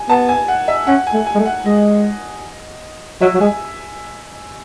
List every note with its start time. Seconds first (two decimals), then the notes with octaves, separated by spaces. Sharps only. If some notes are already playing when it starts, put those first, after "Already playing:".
Already playing: G#5
0.09 B3 A5
0.29 G#5
0.48 F#5
0.68 E5
0.87 C#4 F#5
1.07 G#5
1.13 A3
1.26 G#5
1.35 G#3
1.39 A3
1.46 F#5
1.65 G#3 D#5
3.21 F#3 E5
3.34 F#3
3.40 G#3 G#5